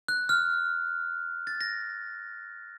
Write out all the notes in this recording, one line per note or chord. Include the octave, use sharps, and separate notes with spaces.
F#6
F6
A6
A#6